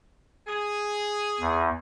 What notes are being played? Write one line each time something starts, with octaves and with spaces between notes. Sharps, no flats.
G#4
E2